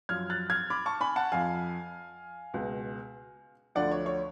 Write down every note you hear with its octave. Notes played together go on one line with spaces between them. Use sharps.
F#2 F3 F6 G#6
F#6 A6
F6 G#6
B5 D6
A5 C#6
G#5 B5
F#5 A5
F2 F3 F5 G#5
C#2 B2
D2 D3 F3 D5 F#5
C#5
C#5